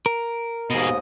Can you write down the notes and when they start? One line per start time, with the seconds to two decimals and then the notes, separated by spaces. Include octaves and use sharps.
0.06 A#4
0.70 D#2 G#2 B2 G#4 D#5